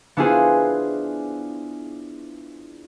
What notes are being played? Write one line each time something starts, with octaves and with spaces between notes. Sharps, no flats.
B3 D4 E4 F4 G#4 C5